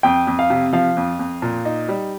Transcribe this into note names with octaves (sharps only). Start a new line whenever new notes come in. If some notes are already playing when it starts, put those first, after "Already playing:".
F2 G5
F2
F5
C3
F3 F5
F2
F2
A#2
D#4
G3